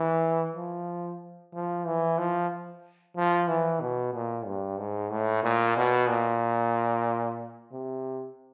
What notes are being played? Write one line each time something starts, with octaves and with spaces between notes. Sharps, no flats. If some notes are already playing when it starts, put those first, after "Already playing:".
Already playing: E3
F3
F3
E3
F3
F3
E3
B2
A#2
G2
G#2
A2
A#2
B2
A#2
C3